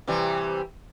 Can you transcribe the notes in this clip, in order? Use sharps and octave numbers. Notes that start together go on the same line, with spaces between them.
C3 E3 G3